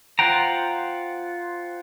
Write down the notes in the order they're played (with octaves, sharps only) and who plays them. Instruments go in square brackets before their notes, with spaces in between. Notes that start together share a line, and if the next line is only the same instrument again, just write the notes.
[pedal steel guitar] F4 C5 F#5 G5 A#5